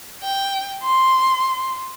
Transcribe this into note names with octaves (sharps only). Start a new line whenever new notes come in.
G5
C6